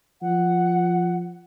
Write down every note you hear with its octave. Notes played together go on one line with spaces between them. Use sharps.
F3 F#5